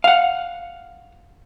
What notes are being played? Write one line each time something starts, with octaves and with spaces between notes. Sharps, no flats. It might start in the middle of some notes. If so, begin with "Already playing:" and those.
F5 F#5